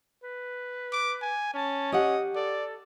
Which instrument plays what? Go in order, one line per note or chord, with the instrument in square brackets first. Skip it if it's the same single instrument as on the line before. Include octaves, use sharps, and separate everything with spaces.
[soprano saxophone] B4
[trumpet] D6
G#5
[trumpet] C#4 [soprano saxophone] A5
[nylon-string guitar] G4 F#5 [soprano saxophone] D#5
[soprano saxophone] A4 [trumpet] D5